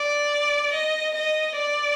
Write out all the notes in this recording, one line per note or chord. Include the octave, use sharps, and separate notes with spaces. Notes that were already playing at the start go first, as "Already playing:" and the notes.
Already playing: D5
D#5
D#5
D5